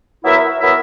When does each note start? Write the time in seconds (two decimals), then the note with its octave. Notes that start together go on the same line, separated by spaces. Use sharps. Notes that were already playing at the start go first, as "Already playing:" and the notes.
0.23 F#3 B3 E4 A#4 E5
0.60 F#3 B3 E4 A#4 E5